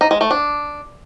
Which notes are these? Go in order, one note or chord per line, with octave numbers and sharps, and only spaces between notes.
D#4
G#3
A3
D4